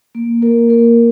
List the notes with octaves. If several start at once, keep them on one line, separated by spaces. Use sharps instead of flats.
A#3
A#3 A#4
A#3 A#4